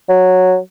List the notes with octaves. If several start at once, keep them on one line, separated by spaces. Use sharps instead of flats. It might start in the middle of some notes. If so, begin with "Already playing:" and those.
F#3